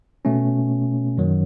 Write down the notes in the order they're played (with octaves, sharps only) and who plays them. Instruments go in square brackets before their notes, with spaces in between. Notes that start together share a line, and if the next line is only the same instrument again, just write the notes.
[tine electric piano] B2 A3 C#4
F#2 D#3 F#3